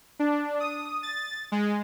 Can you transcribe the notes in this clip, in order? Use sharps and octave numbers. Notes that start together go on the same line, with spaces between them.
D4
D#6
A6
G#3